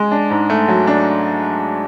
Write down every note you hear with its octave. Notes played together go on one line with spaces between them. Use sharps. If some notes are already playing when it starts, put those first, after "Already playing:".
Already playing: G#3
D4
G#2
A3
F#3
D4